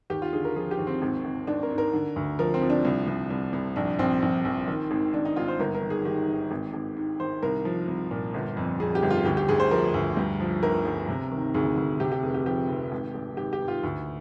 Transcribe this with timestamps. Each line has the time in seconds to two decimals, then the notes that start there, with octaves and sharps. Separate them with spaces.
0.10 D#2 G4
0.22 F4
0.33 D3 G#4
0.45 A#4
0.56 F3 G#4
0.71 G4
0.79 D#2
0.87 C4
1.02 G#1
1.25 G#1
1.47 G#1 D4
1.63 A#4
1.70 G#2
1.78 A#4
1.93 D3
2.16 D2
2.39 F3 A#4
2.54 C4
2.62 F3
2.70 D4
2.85 C2
3.07 C2
3.30 C2
3.53 C2
3.76 A#1 D4
3.99 A#1 C4
4.22 A#1
4.45 A#1
4.68 D#3
4.91 G#1
5.14 G#1 D4
5.25 D#4
5.36 G#1 F4
5.48 C5
5.59 G1 A#4
5.75 A#4
5.82 D#3
5.90 G#4
6.05 D#3 G4
6.28 D#3
6.51 G#1
6.74 G#1
6.97 G#2
7.20 D#3 C5
7.43 C2 A#4
7.65 F3
7.88 C2
8.11 A#2
8.34 G1
8.57 F2
8.80 F2 G#4
8.95 G4
9.03 G1
9.10 F4
9.25 D2 G4
9.37 G4
9.49 D2 G#4
9.60 C5
9.71 F3 A#4
9.94 D2
10.17 G2
10.40 F3
10.63 G1 A#4
10.85 G1
11.09 C3
11.32 D#3
11.54 D2 G#4
11.77 D2
12.00 C3 G4
12.12 G4
12.23 F1 G#4
12.34 G4
12.46 F3 G4
12.69 F1
12.92 G#1
13.14 G#1
13.37 G#1 G4
13.53 G4
13.61 G#2
13.68 F4
13.83 D2